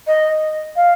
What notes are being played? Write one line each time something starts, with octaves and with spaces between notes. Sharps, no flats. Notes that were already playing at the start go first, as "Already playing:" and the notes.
D#5
F5